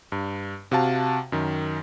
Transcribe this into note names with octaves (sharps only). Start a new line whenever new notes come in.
G2
C3 F#4 F5 A5
F#2 D#3